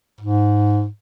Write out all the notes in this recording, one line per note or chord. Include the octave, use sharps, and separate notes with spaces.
G#2